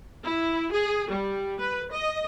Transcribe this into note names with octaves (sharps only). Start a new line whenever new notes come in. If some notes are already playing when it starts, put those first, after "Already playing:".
E4
G#4
G3
B4
D#5